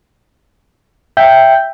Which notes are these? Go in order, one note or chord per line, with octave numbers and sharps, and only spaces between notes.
E5 G5 G6